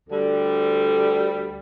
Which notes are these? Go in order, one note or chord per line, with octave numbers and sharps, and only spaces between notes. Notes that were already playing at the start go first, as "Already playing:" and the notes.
D2 D3 G3